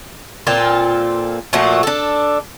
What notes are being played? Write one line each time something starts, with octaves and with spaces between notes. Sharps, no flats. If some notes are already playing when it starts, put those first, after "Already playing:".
A#2 C4 F4 A4
A#2 F3 A3 F#4
D4 A4